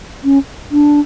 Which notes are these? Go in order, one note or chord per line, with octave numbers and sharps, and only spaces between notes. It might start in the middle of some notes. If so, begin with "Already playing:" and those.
C#4
D4